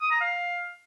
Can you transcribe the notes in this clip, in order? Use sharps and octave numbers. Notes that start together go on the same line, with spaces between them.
D#6
A#5
F5